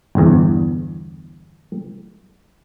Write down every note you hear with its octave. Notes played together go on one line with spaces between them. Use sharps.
G1 E2